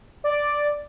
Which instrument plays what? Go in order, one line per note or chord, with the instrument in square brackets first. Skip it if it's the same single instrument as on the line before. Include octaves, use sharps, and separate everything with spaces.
[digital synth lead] D5